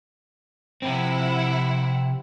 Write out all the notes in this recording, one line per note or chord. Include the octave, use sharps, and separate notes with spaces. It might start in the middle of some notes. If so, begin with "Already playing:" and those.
C3 F3 C4 E4 F#5